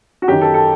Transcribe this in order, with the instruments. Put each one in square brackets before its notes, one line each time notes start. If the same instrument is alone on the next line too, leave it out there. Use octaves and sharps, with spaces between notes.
[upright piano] F#4
F#2 D#3 G4
A4
A4